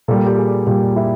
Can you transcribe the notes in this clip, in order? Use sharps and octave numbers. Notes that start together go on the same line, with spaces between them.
A#2 G3 A4
G4
G#4
A#2 G3 G4
E4